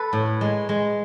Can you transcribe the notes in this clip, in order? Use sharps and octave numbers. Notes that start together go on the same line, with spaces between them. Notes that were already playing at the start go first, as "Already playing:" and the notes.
Already playing: A4 B4
A2
G#3
G#3